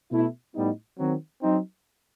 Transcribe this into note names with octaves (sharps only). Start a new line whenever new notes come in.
B2 A3 E4
A2 G3 B3 D#4
D#3 F#3 C4
F#3 C4 D#4